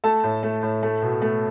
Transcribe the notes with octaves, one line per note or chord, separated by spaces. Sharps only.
A3 A4 A5
A2
A3
A2
A3
B2
A3